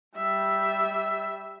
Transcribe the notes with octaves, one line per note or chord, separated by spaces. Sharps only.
G3 E5